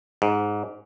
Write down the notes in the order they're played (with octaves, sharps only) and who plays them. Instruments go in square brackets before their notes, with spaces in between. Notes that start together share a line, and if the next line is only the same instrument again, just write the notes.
[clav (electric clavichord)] G#2